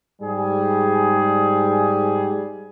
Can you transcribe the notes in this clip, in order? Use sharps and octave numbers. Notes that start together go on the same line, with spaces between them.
G#2 G3 G#4